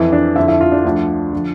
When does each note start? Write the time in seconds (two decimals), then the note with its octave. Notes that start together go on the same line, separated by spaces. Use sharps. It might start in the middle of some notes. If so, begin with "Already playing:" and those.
Already playing: F2 E3 E4
0.12 D4
0.36 F2 D3 F3 E4
0.48 E4
0.61 F4
0.72 D4
0.85 D2 D3 F3
1.33 D3 F3